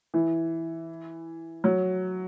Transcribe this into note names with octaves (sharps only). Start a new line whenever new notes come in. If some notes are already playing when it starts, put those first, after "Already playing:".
E3
F#3